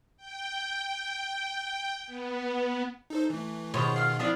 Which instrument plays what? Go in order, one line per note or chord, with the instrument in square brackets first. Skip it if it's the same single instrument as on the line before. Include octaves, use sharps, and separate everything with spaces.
[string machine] G5
B3
[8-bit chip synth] D#4 A4 C5
E3 A3
[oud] B2 C5 [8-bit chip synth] D#3 F4 G#4 [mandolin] B3 C#5
[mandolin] F5 F6
[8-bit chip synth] F3 C4 E4 [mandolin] B3 D4 F5